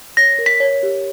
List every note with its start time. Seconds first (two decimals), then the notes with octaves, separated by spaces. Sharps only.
0.17 C#5 A#6
0.39 A#4
0.46 B6
0.60 C#5
0.83 G4